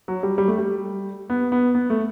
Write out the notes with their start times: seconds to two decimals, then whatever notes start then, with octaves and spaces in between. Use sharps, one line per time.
0.08 F#3
0.23 G3
0.38 G3
0.48 A3
0.58 G3
1.30 B3
1.52 B3
1.75 B3
1.90 A3